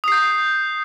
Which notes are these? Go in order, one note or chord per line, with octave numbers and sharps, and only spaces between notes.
D#6 G6 C7